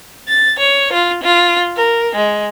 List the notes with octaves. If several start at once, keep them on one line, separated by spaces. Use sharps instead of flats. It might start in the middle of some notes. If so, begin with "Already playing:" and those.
A6
C#5
F4
F4
A#4
G#3